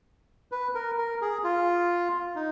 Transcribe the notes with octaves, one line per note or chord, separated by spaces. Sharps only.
B4
A#4
A#4
G#4
F4
D#4